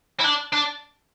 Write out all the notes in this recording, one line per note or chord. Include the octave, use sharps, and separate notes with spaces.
E4
D4
D4